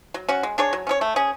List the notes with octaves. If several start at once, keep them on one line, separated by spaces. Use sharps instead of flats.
F#3
C#4 F#4
G#3
D4 G#4 C#5
F#3
C#4 G#4 C#5
A3
C#4 G#4